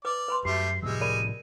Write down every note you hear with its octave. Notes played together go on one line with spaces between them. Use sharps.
B4 D5 D6
B4 B5 C6
F#2 G3 A3 F#4 G4 C7
A2 C3 F3 G3 G#3 E6
A#4 D5 B5 D#7